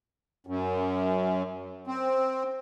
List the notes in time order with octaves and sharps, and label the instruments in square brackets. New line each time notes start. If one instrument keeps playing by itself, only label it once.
[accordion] F#2
C4